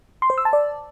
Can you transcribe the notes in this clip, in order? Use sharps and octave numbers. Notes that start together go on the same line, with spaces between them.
C6
C5
E6
A5
D5